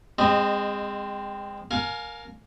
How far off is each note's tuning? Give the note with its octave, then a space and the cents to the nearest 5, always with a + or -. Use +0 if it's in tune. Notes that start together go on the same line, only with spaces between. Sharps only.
G#3 -30 C4 +0 D#5 -10
A#4 -5 F5 +20 G#5 +25